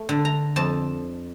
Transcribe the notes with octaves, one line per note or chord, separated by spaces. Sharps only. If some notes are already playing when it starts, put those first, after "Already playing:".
Already playing: A3
D3
A#5
F2 A5